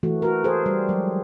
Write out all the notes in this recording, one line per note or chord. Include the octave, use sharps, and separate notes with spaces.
E3 A3 F#4
F#4 A#4
G#4 A4 C5
G3
F#3 G#3